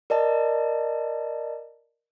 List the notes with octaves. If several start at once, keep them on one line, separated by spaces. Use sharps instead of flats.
A#4 D5 D#5 A5